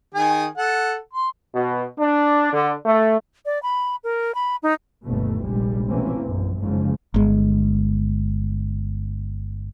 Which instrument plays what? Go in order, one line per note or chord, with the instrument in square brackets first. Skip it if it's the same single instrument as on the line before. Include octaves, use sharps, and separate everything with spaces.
[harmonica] D#3 G#4 G#5
A4 F#5
C6
[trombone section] B2
D4
D3
A3
[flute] D5
B5
A#4
B5
D#4
[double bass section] G1 D#2 B2 A3
F1 A#1 G3 G#3
B2 E3 A3 A#3 C4 C#4
A#1 F#2
F#1 G#2 C#3 F3
[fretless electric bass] G1 G#3